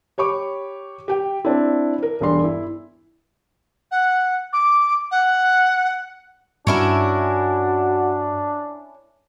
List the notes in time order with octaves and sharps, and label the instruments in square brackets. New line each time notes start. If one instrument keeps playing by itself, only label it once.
[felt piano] G4 C#5 B5 C#6 D6
G4 G5
C4 D4 E4
A#4
E1 G2 C6
E4
[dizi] F#5
D6
F#5
[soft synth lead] G2 [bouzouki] C#4 E4 A#4 [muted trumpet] D4 [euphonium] F#4